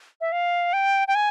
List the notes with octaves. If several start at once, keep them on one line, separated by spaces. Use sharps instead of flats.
E5
F5
G5
G5
G#5